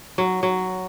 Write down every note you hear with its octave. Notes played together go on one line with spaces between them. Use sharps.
F#3
F#3